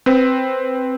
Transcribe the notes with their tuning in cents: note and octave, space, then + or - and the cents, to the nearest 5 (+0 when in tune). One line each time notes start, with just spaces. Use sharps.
C4 +0 B4 +10